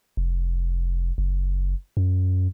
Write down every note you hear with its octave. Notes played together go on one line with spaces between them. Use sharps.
F1
F#1
F#2